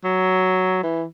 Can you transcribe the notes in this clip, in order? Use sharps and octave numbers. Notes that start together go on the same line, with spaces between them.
F#3
E3